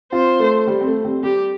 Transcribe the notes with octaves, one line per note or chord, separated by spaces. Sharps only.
C4 F4 C5
A3
G3
C4
A3
G3 C4
G3 G4